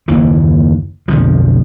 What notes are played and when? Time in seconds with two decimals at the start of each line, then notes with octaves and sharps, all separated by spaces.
0.08 F#1 D#2 E3
1.08 B1 F2 D3 F3